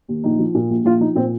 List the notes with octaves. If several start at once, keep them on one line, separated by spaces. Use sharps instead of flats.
D#2
A#1 D#4
F3
A#2
A#1
A#1 F4
F3 D#4
A#2 C4